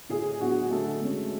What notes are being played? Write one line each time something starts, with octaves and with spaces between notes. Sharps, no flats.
A2 G#4
F#3 B3 D4 F#4
D3 A3 A4
G#3 C#4